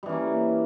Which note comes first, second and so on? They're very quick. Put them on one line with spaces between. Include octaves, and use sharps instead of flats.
G3 E3 C#4 A#3